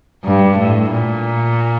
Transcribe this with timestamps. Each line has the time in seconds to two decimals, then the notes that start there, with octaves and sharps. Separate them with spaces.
0.24 G2
0.58 A2
0.90 A#2